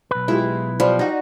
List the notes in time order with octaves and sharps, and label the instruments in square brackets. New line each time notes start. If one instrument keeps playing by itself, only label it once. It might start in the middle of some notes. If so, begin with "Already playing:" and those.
[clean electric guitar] B1 B4
[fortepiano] G#3 F4 G4 [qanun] E4
[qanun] F3 [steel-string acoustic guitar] G3 [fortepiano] B5
[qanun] D#4 F#4